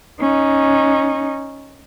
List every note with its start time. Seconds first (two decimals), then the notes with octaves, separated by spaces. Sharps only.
0.20 C#4 D#4